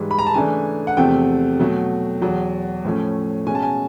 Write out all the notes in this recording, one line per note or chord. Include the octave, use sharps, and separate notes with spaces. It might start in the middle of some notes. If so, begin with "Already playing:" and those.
Already playing: G#2 E3 G3
B5
A#5
A5
C#3 E3 A3 D4 G#5
F#5
E2 C3 F3 A3 C4 G5
B2 F#3 A3
E2 B2 F#3
A2 F3 A3 C#4
B2 G#3 C#4 G#5
A5
G#5